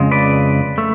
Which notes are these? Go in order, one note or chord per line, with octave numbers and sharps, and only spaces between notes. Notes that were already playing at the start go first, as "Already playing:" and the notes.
Already playing: F2 C#3 G#3
B4 D5
A3